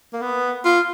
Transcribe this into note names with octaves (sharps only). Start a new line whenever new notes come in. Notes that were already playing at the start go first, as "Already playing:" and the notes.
A#3
B3
F4